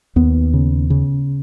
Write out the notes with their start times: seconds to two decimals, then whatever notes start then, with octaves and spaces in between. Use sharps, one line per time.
0.16 D#2 B3
0.54 C#3
0.90 C#3